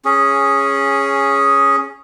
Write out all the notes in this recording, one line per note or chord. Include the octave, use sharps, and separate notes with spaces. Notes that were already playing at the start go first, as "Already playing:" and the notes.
C#4 G#4